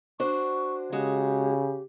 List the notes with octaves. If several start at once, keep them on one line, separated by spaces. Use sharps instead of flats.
D4 F#4 C5 C#6
C#3 G#3 F#4 G4